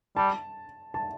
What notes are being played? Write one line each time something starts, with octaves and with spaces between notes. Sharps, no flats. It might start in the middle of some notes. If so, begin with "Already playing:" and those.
G3 A5
A5